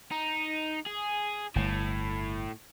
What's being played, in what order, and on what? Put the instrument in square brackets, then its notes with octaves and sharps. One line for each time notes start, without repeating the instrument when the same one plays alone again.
[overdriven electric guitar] D#4
G#4
[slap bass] G1 [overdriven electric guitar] A2